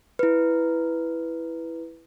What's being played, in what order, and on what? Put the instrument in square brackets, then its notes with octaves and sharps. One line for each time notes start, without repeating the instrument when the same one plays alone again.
[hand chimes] E4 B4